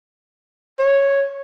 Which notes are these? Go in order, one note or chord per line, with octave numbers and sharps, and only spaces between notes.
C#5